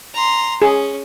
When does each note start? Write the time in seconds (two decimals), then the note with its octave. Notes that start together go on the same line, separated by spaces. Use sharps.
0.14 A#5 C6
0.62 C#4 G#4